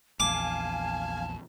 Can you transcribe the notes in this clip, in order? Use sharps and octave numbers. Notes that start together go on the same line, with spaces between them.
A#1 E2 F5 G#5 A5 D6